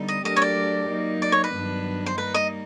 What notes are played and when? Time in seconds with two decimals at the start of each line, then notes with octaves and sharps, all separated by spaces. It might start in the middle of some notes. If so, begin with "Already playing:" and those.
Already playing: D3 G3 B3 D#4
0.08 D#5
0.25 F#3 A3 D4 G4 A#4 D#5
0.36 C#5
0.42 D5
0.90 F#3 A#3 D#4
1.22 D5
1.32 C#5
1.44 B4
1.54 G2 D#3 F#3 B3 D4
2.06 C5
2.18 G3 A#3 D#4 B4
2.34 D#5